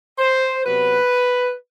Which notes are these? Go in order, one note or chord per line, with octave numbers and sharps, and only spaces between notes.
C5
C3 F#3 B3 B4